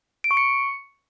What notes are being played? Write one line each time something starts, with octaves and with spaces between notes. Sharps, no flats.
D7
C#6
C#7